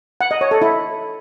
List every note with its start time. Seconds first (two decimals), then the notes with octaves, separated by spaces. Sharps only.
0.21 F#5
0.31 D#5
0.41 C#5
0.51 A4
0.62 E4